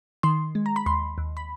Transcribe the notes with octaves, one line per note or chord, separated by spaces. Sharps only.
D#3 C6
G#3
A#5
B5
D#2 C6
D#2
B5